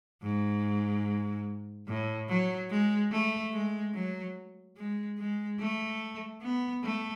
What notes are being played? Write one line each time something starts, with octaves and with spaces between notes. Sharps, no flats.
G#2
A2
F#3
G#3
A3
G#3
F#3
G#3
G#3
A3
B3
A3